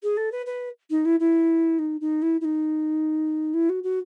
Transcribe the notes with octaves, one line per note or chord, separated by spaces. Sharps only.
G#4
A4
B4
B4
D#4
E4
E4
D#4
D#4
E4
E4
D#4
E4
F#4
F#4